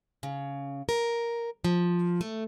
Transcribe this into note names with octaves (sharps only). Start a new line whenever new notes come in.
C#3
A#4
F3
A3